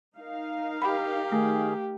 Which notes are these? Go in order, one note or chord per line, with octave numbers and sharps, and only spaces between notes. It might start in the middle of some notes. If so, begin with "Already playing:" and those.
D#4 A#4 F5
G4 B5
D#3 A3 G#4